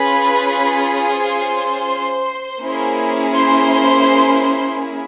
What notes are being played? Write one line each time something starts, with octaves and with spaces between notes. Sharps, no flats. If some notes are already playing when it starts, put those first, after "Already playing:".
Already playing: C#4 F4 G#4 B4 B5
C5 C6
A#3 C#4 E4 G#4
C5 C6